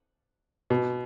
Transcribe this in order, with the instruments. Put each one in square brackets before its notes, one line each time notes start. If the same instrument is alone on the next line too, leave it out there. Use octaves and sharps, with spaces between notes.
[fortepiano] B2